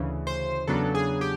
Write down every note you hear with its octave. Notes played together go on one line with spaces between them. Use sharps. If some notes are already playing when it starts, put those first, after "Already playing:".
Already playing: D2 C#3 E3
C5
E2 C#3 F#3 B3 D4 A4
G#4
G4